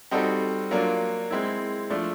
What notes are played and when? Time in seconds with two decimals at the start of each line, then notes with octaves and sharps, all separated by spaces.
0.11 G3 C4 D#4 F#4 A4
0.71 F#3 A#3 D4 F4
1.30 G#3 C4 E4
1.90 F3 A3 D4